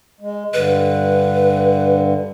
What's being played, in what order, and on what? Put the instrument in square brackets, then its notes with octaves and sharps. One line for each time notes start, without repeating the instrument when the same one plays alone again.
[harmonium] G#3
[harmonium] G2 D3 [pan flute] B4